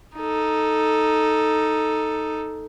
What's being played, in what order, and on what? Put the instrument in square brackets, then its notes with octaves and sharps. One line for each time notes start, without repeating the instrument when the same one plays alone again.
[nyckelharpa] D#4 A4